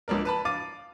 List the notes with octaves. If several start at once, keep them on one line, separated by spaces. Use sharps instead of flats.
C#2 A#3 D4 A#4
B4 A5 B5
F5 D6 A6 D#7